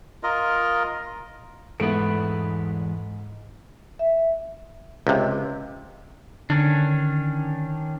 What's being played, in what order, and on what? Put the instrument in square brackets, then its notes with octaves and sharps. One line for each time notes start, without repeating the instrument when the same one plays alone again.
[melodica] F4 A#4 D#5
[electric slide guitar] E2 G#3 E4 [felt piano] G#2 D7 [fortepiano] A3 B3
[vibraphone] E5
[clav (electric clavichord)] C#2 C3
[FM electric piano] D3 [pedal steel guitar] D#3 C#4 D4